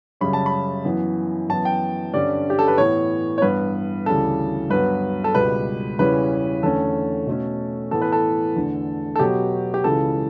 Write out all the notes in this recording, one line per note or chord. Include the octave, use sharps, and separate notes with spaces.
F#2 C#3 G3 C#4 B5
A5
B5
F#2 E3 B3
F#2 E3 B3 A5
G5
G2 D3 G3 C#4 D5
G4
A4
B4
A2 E3 B3 C#5
C#5
G2 E3 B3 B4
D2 C#3 E3 G3 A4
G2 F#3 B3 B4
A4
C#2 B2 G3 B4
E2 C#3 E3 G3 C#4 B4
E2 D3 A3 C#4 A4
B2 A3 C#4
A2 E3 B3 A4
B4
A4
E2 D3 A3
A4
B2 F#3 B3 G4
G4
C#2 C#3 E3 A4